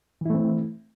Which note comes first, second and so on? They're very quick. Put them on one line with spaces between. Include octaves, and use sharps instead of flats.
E3 E4 A3 C4